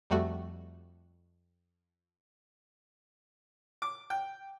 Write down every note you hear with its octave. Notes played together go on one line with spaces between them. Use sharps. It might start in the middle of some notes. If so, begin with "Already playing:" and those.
F2 G3 A3 F#4
D6
G5